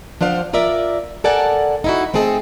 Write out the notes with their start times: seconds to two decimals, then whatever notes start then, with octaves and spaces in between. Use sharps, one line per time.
0.21 F3 D4 C5 F5 F#5
0.53 F4 A#4 D5 E5
1.24 A4 A#4 D5 F#5 G#5 A5
1.84 D#4 E4 F#4
2.14 A3 C4 D#4 G#4 A4